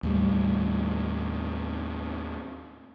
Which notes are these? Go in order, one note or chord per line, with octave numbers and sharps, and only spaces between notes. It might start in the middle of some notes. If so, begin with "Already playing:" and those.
D#2 A2 G3